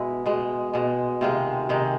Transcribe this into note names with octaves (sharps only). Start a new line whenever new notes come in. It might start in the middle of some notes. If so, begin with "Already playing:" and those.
Already playing: B2 G#3 E4
B2 G#3
B2 G#3
C3 D#3 G#3 F4
C3 D#3 G#3